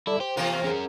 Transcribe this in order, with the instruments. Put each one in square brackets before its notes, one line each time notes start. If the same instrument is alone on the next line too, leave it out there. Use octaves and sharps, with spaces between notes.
[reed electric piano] G3 A4 D5 [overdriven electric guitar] E4
[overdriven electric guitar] G4 [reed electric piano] C5
[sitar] E2 C3 A#3 [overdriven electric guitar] F4
[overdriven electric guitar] C#4 A#4 [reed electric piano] G#4